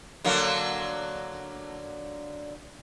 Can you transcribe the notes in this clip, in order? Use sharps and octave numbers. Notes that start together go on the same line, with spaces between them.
D3 F#3 A#3